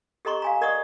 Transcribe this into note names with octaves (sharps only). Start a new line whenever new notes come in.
G4 A4 D#5 A#5 C6 C#6
F5 G#5 A#5
A#4 D5 D#5 F#5 C#6 D#6